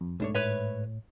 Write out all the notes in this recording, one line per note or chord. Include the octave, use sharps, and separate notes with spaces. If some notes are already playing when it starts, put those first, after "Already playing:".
F2
B1 G#2 A3 D4 C#5
A2 B4 C#5 E5